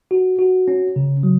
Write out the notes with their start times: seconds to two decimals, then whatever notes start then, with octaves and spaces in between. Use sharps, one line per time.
0.11 F#4
0.39 F#4
0.68 C#4
0.96 C#3
1.23 F#3